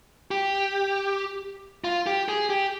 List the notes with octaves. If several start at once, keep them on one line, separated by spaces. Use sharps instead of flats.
G4
F4
G4
G#4
G4